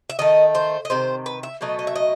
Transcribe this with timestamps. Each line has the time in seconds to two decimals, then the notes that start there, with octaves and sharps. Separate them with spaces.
0.10 E5
0.19 D#3 A3 D#5
0.55 C5
0.85 D#5
0.90 C3 D#3 C5
1.26 B4
1.43 E5
1.61 B2 F#3 A3 D#5
1.79 D#5
1.87 E5
1.96 D#5